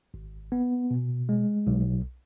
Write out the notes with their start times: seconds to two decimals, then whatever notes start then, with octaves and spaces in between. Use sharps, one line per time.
0.14 G#1
0.52 B3
0.91 B2
1.29 G#3
1.67 B1